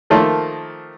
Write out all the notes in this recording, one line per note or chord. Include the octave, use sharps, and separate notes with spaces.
D#3 F3 A3 A#3